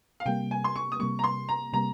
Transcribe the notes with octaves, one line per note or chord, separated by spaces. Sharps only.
F5
C3 G3 A#3 G5
G#5
C6
C#6
D#6
C3 G3 A#3 C#6
A#5
C6
A#5
C3 G3 A#3 A#5